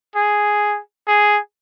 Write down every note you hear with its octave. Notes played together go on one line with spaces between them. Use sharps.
G#4
G#4